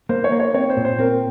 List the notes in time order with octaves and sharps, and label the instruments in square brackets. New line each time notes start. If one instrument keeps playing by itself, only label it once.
[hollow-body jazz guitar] A#3 [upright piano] C5
[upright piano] C#5
[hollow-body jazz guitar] A#3
[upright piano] C#5
[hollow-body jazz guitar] C4 [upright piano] C#5
[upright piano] C5
[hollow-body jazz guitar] A#2
[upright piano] C5
[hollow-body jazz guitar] C4 [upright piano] A#4